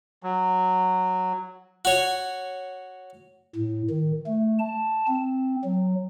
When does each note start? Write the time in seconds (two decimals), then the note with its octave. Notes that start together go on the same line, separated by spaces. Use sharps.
0.23 F#3
1.85 F#4 C#5
3.56 A2
3.90 D#3
4.26 A3
4.59 A5
5.08 C4
5.65 F#3